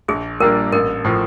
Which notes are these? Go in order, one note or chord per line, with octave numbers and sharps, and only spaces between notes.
A#1 G#4
A#2 G3 A#3 D4 A#4
A1 A#4
A2 F3